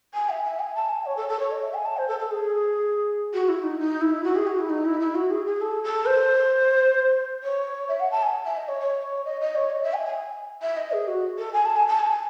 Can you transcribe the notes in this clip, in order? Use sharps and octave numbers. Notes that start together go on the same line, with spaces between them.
G#5
E5
E5
G#5
A5
G#5
C#5
A4
A4
C#5
D#5
E5
G#5
A5
C5
A4
A4
G#4
F#4
E4
D#4
D#4
E4
F#4
G#4
F#4
E4
D#4
E4
E4
F#4
G#4
G#4
A4
A4
C5
C#5
E5
F#5
A5
G#5
E5
D#5
C#5
C#5
D#5
D#5
C#5
D#5
E5
G#5
G#5
E5
D#5
G#4
F#4
A4
G#5
A5
G#5
A5
G#5